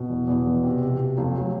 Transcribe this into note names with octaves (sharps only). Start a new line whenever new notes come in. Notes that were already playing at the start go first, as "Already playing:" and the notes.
Already playing: B2
E2
E2
B2
C3
C3
C3
F1
F#3